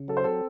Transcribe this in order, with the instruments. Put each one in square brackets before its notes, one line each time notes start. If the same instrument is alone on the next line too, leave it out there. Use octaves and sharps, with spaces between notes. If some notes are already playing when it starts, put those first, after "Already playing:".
Already playing: [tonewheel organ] C#3
[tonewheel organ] F#3 [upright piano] A4
[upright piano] C5
[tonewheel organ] C4 [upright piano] A4